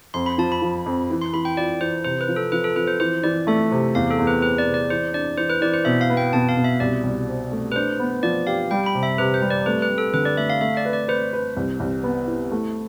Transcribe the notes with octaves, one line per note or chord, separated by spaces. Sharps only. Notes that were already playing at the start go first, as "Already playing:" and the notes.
F2 C6
B5
F3 A5
B5
F3
F2
E3
C6
E3 B5
G5
F4 D5
E3 C5
C3 C5
B4
F3
A4
F3 B4
A4
F3 B4
C5
E3 C5
E3 D5
A3 E5
C3
E2 F5
A4
E2
B4
C4 B4
D5
C3
D5
E3 C5
D4 D5
E3 C5
B4
E3 D5
C5
B2 E5
F5
B3
G5
B2 A5
F5
B2
E5
C2 D5
C2
C4
A3
B4
D4 C5
B3
F3 D5
G4 F5
G3 G5
B5
C3
E5
C3 B4
C5
G3
D5
A3 B4
B4
A3
A4
D3 B4
D5
A3 E5
F5
A3 E5
D5
B4
D5
B4 C5
B4
C2
C2
B3
E4
A3